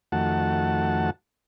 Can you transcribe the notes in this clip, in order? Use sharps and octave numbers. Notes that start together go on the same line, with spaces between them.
F2 D#3 A3 F#4 F#5 A5